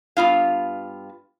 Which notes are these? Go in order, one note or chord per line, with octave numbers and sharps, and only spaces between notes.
G2 B3 F4 F5